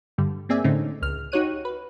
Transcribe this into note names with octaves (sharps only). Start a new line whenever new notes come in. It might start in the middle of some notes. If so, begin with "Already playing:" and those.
G2 D3 G3
A#3 C4 G#4 D5 E5 G#5
A2 D3 A3 C4 C#4 D#4
C#2 F6
D#4 F#4 G4 C#5 F#6 D#7
B4